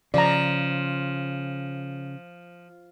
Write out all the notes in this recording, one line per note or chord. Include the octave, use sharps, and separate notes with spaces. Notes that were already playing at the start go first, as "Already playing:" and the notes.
C#3 F3 D5 A#5